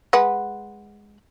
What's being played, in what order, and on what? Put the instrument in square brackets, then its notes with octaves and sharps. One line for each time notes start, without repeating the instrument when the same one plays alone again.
[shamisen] G#3 B4 F#5